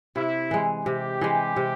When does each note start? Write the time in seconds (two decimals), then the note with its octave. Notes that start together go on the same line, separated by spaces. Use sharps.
0.16 C3 E4
0.51 E3 G#3
0.86 C3 G4
1.21 E3 G#3
1.56 C3